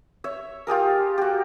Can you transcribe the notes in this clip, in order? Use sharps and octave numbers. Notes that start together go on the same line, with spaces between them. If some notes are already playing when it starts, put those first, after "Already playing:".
C#5 E5
F4 G4 G#4 A#4
F#4 G4